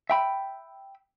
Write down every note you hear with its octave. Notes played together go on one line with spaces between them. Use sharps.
E5 G5 B5